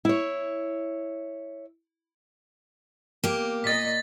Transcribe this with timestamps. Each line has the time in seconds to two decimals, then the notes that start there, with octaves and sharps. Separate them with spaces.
0.05 E4 C#5
3.24 A#3 G4
3.64 A#2 D#5 A6 B6